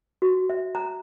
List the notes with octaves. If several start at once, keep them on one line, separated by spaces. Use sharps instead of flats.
F#4
E5
A#5